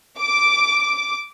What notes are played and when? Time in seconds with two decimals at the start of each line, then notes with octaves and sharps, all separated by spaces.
0.18 D6